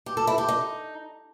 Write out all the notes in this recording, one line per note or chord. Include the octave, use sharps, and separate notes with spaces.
G4
A4
E4
G4
D#4